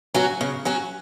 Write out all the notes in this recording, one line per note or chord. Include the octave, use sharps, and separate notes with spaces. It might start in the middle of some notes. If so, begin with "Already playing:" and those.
F#3 C#4 F#4
C#3
F#3 C#4 F#4